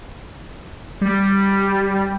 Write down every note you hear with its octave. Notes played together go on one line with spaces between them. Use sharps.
G3